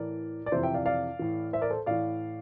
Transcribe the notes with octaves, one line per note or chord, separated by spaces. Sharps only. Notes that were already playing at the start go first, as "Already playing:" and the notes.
Already playing: A2 E3 A#4 D5
D5
F2 C3 E3 C5 E5
E5 G5
D5 F5
D5 F5
A2 E3
C5 E5
A#4 D5
A4 C5
A2 E3 D5 F5